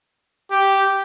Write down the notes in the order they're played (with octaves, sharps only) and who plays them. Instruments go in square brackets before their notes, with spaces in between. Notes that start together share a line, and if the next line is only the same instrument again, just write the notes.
[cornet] G4